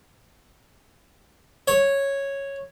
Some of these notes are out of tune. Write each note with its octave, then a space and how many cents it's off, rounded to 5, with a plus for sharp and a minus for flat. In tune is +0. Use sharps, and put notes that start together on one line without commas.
C#5 -5